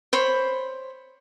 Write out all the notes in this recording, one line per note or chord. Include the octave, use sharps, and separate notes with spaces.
C5 C#5 B5